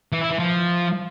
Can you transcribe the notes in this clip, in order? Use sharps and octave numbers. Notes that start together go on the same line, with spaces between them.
E3
E4
E3
F3